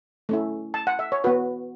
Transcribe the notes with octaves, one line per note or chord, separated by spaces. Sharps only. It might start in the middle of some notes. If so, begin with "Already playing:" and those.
A3 C#4 E4
A5
F#5
E5
C#5
B3 F#4 B4